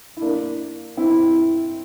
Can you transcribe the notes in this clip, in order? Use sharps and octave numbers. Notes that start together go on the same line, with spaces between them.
E4
A#3 D4
C4 E4